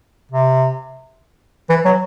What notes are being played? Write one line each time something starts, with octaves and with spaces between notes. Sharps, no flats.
C3
E3
F#3